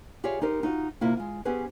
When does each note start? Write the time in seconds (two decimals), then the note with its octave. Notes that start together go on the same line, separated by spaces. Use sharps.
0.24 F4 G4 G#4 C5 C#5 E5
0.41 D#4 G4 A#4 C5
0.63 D#4 F4 F#4
1.01 C3 A#3 E4 F4
1.17 G#3 F4
1.45 B3 C#4 G4 G#4 B4 C5